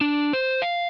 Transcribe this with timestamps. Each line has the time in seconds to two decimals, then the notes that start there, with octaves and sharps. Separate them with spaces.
0.01 D4
0.33 C5
0.62 F5